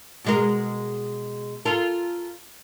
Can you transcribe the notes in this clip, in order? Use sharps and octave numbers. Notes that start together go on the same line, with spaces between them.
B2 G#3 A#4
F4 A4 A#4